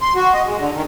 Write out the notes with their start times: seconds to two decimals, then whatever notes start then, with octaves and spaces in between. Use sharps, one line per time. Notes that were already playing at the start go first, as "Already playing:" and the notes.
0.01 C6
0.15 F#4
0.34 D#5
0.46 G#3
0.57 D3
0.73 D#3